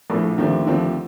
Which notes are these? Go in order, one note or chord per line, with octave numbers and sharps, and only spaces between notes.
A#1 A2 F3 A3
D#2 D3 F3 A3 C4
D#2 D3 F3 A3 C4